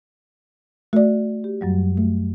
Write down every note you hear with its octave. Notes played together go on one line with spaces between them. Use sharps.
A3 F#4 D5
G4
F#2 F#3 G3
A3